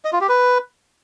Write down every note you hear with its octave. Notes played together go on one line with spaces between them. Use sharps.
D#5
F4
G4
B4